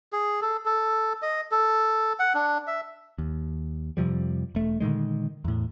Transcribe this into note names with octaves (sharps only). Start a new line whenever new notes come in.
G#4
A4
A4
D#5
A4
F#5
D4
E5
D#2
F2 C3 F3 G3
E1 A3
A#2 D3 D#3 G#3
E2 A2